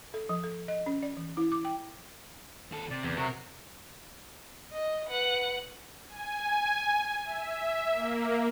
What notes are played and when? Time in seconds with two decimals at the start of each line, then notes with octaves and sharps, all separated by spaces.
0.14 A4
0.29 F3
0.44 A4
0.68 D#5
0.86 C#4
1.03 D5
1.17 E3
1.37 E4
1.52 D6
1.65 G5
2.72 D#2 A4
2.91 C3 D5
3.04 E2
3.17 C3 F#3 F#4 A#4
4.72 D#5
5.07 B4 F#5
6.08 G#5
7.24 E5
7.91 A#3